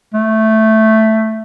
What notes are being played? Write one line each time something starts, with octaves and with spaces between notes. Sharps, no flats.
A3